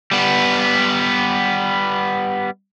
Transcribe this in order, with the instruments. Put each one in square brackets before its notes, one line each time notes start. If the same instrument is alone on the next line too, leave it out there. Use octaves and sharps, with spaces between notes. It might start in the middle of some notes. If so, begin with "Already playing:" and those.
[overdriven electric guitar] G3 B3